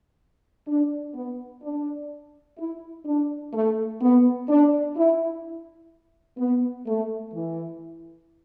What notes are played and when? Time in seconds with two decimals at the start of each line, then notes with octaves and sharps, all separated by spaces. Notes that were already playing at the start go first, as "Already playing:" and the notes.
0.68 D4
1.15 B3
1.62 D4
2.58 E4
3.06 D4
3.54 A3
4.01 B3
4.49 D4
4.96 E4
6.38 B3
6.87 A3
7.34 E3